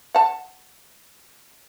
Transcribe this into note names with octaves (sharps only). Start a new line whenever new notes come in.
F#5 A5